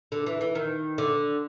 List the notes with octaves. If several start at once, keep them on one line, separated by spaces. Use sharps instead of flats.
D3
E3
E3
D#3
D3